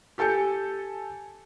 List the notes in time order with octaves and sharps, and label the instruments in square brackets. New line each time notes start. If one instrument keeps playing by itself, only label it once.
[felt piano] G4 A4 G#5 G6 C#7